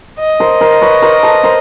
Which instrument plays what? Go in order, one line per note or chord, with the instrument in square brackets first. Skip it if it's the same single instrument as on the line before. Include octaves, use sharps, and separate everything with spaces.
[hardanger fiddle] D#5
[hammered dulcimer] A#4 C5
A#4 C5
B4 C#5
A#4 C5
A4 B4
A#4 C5